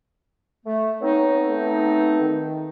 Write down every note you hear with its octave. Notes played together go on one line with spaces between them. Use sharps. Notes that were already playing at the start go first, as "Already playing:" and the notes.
A3
B3 C4 D#4 C#5
A3
D#3